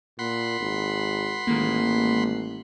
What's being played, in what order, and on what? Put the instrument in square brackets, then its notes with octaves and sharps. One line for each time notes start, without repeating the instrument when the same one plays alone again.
[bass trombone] A#2 [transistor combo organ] F#5 B5 C6
[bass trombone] G#1
[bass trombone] A1 [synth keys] D#3 G#3 A#3